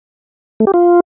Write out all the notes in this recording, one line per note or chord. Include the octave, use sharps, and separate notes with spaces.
A3
G4
F4